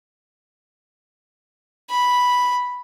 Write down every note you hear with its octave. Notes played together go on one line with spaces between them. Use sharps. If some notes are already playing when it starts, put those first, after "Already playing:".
B5